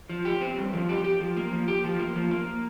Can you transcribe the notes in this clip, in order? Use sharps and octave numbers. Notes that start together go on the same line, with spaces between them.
F3
G4
C4
G2
F3
G4
G4
F3
A#3
F3
G4
F3
A#3
F3
A#3